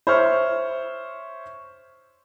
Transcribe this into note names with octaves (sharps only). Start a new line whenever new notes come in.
C5 C#5 E5 C#6 F6